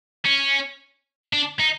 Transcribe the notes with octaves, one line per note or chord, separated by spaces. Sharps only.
C#4
D4
D#4